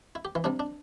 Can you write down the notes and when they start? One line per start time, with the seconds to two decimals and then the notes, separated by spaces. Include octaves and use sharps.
0.15 E4
0.25 G4
0.35 E3 E4
0.44 C3 G3 D4
0.59 D4